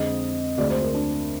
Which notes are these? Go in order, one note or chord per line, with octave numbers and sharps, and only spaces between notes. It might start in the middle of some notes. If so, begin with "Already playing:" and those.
Already playing: F2 D3 G#3 C4 D#5
D2 D3 G#3 C4 D5
C5
A#4
D4